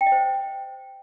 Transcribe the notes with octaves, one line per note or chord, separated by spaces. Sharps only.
G5
D#5
C5